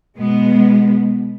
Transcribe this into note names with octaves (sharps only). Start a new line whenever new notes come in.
B2 G#3 B3